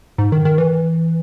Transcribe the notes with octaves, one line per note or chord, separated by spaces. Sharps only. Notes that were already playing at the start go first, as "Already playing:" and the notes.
G#2
D#3
D#3
E3